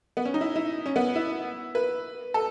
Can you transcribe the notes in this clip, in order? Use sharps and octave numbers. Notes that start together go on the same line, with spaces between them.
B3
C#4
D#4
E4
E4
C#4
B3
E4
B4
A4